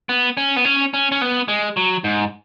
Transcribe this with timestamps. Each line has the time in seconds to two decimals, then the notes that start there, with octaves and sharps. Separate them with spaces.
0.09 B3
0.37 C#4
0.56 B3
0.65 C#4
0.94 C#4
1.12 C#4
1.21 B3
1.48 G#3
1.77 F#3
2.04 G#2